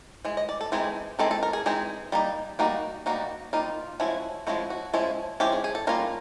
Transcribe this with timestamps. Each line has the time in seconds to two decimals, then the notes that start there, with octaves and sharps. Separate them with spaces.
0.25 E3 G#3
0.37 D#5
0.49 D5
0.61 A4
0.72 E3 G#3 C4 D#4 G#4
1.19 E3 G#3 C4 D#4 A4
1.31 A4
1.43 A#4
1.53 G#4
1.66 E3 G#3 C4 D#4 G#4
2.12 G3 A#3 D#4
2.59 G3 A#3 D#4 F#4
3.06 G3 A#3 D#4 F#4
3.53 G3 A#3 D#4 F4
4.00 F3 G#3 C#4 E4 F#4
4.47 F3 G#3 C#4 E4 F#4
4.70 F#4
4.93 F3 G#3 C#4 E4
5.40 F3 G#3 C#4 E4 G4
5.52 G#4
5.64 G#4
5.75 A4
5.87 G3 A#3 C#4 F4 A#4